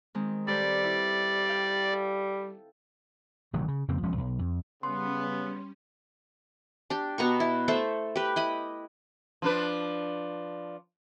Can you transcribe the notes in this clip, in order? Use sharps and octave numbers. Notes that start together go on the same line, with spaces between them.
D#3 G#3 C4
G3 A4 B4 C5 D5
E4
F5 G5
A4
A1 C3 D#3 F#3
C#3
F2 C#3 A#3 C4
E1 F3 G#3 C#4
B1
F2
C#3 G3 B3 C#4 C6
D4 G4
B2 B3 A#5 C#6
E4
A3 A4 C5 E5
G4 B4
E4 D#5 B5
F3 D4 B4